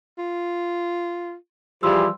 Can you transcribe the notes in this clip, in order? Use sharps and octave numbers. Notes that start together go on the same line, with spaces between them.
F4
E3 F3 G3 G#4 C6 E6